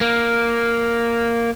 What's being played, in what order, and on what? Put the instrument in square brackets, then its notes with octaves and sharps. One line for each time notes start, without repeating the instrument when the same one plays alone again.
[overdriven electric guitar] A#3